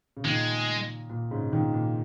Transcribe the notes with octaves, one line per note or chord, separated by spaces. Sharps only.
C#3
A#2 D#3 G#3
A#2
G#2 C#3
A#2 D#3
A#2